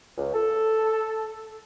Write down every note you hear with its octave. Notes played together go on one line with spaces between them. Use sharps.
C#2
A4